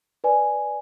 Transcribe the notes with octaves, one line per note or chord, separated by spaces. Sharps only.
B4 D5 G#5